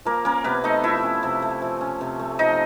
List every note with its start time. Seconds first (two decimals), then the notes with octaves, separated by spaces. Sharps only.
0.05 F3 A#3 A#4
0.25 A#3 C#4 A#4
0.44 C3 B3 B4
0.64 A3 D#4 D#5
0.83 F3 E4 E5
1.03 C#4
1.23 C3
1.42 A3
1.62 F3
1.81 C#4
2.01 C3
2.19 A3
2.39 F3 D#4 D#5